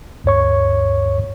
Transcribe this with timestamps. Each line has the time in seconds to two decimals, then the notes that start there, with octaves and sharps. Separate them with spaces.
0.24 D2 G2 C#5 C#6